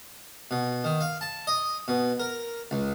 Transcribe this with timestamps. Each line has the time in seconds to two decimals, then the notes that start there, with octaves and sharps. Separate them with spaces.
0.51 B2
0.84 D#3
1.01 F5
1.21 A5
1.47 D#5
1.88 B2
2.20 A#4
2.71 C#2